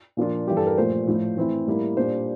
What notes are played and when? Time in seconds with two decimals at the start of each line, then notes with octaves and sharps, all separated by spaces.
0.17 A#2 F3 A#3 D4 F4
0.47 G2 E3 G3 G4
0.57 A4
0.67 A#4
0.78 A#2 F3 A3 C5
1.07 A2 F3 A3
1.37 E3 A3 C4 E4
1.67 A2 G3 A#3 E4
1.97 A#2 G3 D4 C5